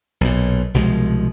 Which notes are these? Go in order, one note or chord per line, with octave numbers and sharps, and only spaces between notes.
B1 A#2
C2 B2 F3 G#3